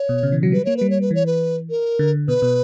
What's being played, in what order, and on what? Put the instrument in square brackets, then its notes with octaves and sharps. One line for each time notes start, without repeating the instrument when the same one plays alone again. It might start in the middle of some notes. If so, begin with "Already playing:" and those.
Already playing: [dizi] C#5
[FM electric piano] B2
C#3
E3
F#3
[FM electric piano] G3 [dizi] B4
[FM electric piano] A#3 [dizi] C#5
[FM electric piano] G3 [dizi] B4
[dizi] C#5
B4
[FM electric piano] E3 [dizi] C#5
[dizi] B4
A#4
[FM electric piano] D3
[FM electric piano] B2 [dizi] B4
[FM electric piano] B2